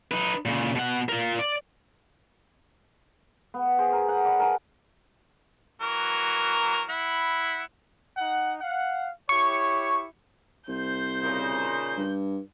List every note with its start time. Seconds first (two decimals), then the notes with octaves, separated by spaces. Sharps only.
0.11 D#4 B4
0.45 A#2 C#3
0.75 B2 F#5
1.09 F4 A#4
1.39 D5
3.54 B3
3.78 G#4 C5
3.92 A#4
4.09 F#5
4.25 B4 D5
4.39 A#4 G#5 A5
5.81 E3 F#3 A#4
6.90 E4 F#5 B5
8.17 D#4 F#5
8.58 F5 F#5
9.29 E4 G4 C#5 C#6
10.69 C2 C5 G6
11.22 A#2 C#3 D#4
11.97 G2